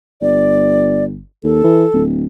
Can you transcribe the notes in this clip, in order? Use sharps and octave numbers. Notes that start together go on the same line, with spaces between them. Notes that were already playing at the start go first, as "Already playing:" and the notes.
G1 D5
D#2 A4
E3
D1